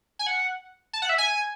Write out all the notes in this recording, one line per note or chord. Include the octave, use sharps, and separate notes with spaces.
G#5
F#5
A5
F#5
E5
G#5